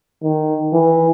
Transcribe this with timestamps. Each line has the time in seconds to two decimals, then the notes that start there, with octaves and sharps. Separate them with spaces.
0.23 D#3
0.73 E3